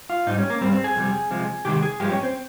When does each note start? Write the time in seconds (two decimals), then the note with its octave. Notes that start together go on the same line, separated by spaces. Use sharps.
0.10 F4
0.27 G#2 G3 D#4
0.38 C#4
0.50 A#3
0.61 G3 C4
0.64 G2
0.73 C4
0.84 G#4
0.96 F2 C3 G3
1.31 C3 F3 G#3
1.65 C3 D#3 G#3 G4
1.82 G#4
2.00 G2 F3 G#3 G4
2.11 C#4
2.23 C4